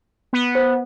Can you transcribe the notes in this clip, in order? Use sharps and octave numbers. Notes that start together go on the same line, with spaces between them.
B3
C5